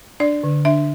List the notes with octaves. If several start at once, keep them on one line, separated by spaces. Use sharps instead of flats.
D4 D5
D3
D4 E5